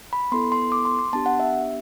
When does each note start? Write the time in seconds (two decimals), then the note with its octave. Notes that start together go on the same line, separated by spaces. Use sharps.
0.13 B5
0.32 B3 E4 A4 C6
0.52 C6
0.72 D6
0.85 C6
0.99 C6
1.13 B3 D4 G4 A5
1.26 F#5
1.40 E5